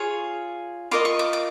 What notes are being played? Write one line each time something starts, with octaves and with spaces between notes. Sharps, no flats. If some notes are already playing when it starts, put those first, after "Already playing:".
Already playing: F4 G#4 C#5
F4 A#4 D#5 D6
C#6
D6
D6